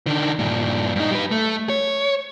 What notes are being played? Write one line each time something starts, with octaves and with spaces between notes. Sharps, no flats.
D3 D#3
G2 A#2
G2 D#4
G3 B4
A3
C#5